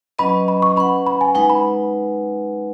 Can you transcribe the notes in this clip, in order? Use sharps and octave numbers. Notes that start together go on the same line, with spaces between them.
F#3 C#4 B4 D#5 B5
B5
C#6
C#4 B4 F#5 B5
B5
G#5
G#3 D#4 B4 F#5 G#5
B5